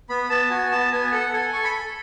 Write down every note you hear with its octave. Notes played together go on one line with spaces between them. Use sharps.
B3 B5
B3 A5
F#4 G#5
B3 A5
B3 G#5
A4 F#5
A4 G#5
A4 C#6
B5
A4